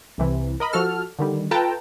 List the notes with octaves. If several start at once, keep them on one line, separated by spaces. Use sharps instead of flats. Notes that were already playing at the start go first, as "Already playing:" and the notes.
C2 C3 E3
A#4 D#5 B5
F3 F#4 A4 F6
D3 D#3 G3
F4 A4 B4 G5 A5 A#5